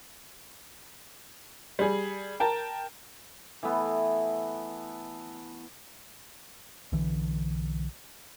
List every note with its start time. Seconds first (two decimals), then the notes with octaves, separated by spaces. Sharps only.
1.79 G3 G#4
2.40 A#4 G5 A5
3.63 E3 A3 B3
6.92 B1 D3 E3